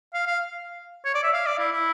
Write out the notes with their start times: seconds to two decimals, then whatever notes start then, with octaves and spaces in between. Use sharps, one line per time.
0.14 F5
0.27 F5
1.05 C#5
1.14 D5
1.23 E5
1.33 F5
1.46 D5
1.59 E4
1.72 E4